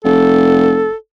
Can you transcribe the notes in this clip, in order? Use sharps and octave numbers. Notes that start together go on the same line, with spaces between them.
F1 A4